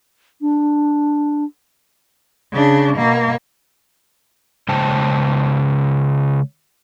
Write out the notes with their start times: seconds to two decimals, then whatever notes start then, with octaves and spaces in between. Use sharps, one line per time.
0.41 D4
2.52 C#3 D4
2.97 B2 A#3
4.69 C#3 G#3 C5 G5 A5